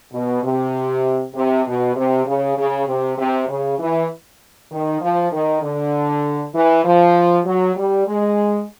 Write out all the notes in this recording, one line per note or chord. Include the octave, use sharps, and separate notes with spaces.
B2
C3
C3
B2
C3
C#3
C#3
C3
C3
C#3
E3
D#3
F3
D#3
D3
E3
F3
F#3
G3
G#3